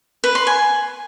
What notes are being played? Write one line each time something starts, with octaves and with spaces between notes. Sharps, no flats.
B4
C6
G#5